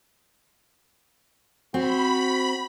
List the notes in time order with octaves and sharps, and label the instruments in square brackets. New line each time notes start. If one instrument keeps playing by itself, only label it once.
[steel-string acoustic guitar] C4 [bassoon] F#4 [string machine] B5